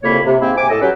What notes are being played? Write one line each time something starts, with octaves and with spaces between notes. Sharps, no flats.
C2 F2 C#3 A#3 C#5 B5
C3
G#2 G#3 A#3 C4 E4
C3 G#5 D6
A2 A4 D#5
F#3 C#4 G4 B4